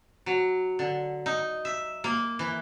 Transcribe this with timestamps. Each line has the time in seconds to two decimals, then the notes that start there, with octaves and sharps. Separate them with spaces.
0.26 F#3
0.79 D3
1.26 D#4
1.65 E5
2.04 A#3
2.39 E3